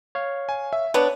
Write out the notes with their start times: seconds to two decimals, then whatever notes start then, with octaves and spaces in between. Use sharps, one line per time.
0.15 C#5 F5
0.49 G#5
0.73 E5
0.94 B3 D4 C#5